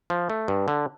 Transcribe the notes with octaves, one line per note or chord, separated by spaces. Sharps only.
F3
A3
G2
D3